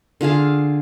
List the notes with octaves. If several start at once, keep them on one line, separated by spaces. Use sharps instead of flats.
D3 F4 G#4 F5